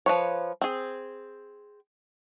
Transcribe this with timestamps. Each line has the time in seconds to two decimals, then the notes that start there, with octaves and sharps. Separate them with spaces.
0.06 F3 B4 C#5
0.61 C4 G#4